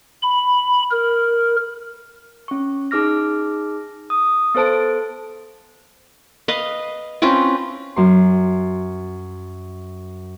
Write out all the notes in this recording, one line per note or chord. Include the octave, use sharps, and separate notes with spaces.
B5
A#4
C#4 C#6
D#4 G#4 D6 F6 A#6
D#6
B3 A4 C5 A5 D7
B4 D#5 F5
C4 C#4 F4 B4
F#2 C6